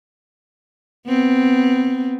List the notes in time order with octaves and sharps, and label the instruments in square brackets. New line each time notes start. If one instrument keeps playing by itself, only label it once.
[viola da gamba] B3 C4